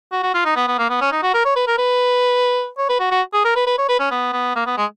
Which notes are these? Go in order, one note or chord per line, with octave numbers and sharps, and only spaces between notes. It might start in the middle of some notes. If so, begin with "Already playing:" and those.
F#4
F#4
F4
D#4
B3
B3
A#3
B3
C#4
D#4
F#4
A#4
C#5
B4
A#4
B4
C#5
B4
F#4
F#4
G#4
A#4
B4
B4
C#5
B4
C#4
B3
B3
A#3
B3
G#3